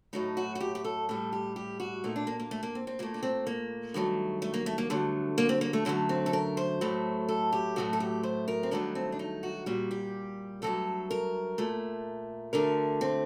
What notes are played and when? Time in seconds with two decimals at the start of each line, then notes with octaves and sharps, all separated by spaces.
0.13 A2 F#3 A3 D#4
0.37 F#4
0.55 F#4
0.60 G4
0.75 G4
0.84 A4
1.09 A2 G3 A4
1.32 G4
1.56 G4
1.80 F#4
2.04 A#2 A3 D#4
2.16 D4
2.27 A#3
2.40 A#3
2.51 A3
2.63 A#3
2.75 C4
2.87 C4
2.99 A#2 A3 A#3
3.14 D4
3.23 C4
3.47 A#3
3.94 G2 D#3 F#3 A3
4.42 A3
4.54 A#3
4.66 A3
4.78 A#3
4.90 G2 D3 F#3 A3
5.38 A#3
5.49 C4
5.61 A#3
5.73 A3
5.85 F#2 D3 F#3 A3 A#3
6.09 C4
6.26 A4
6.33 A#4
6.57 C5
6.81 A2 F#3 A3
7.29 A4
7.53 G4
7.76 A2 F#3 A3 F#4
7.93 A4
8.00 G4
8.23 C5
8.48 A#4
8.63 C4
8.71 G2 D#3 F#3 A3 D4
8.95 C4
9.12 D4
9.19 D#4
9.43 F#4
9.66 A#2 G3 F#4
9.91 G4
10.62 G2 F#3 A3 A4
11.11 A#4
11.58 A#2 A3
12.53 D2 D3 A3 A#4
13.01 C4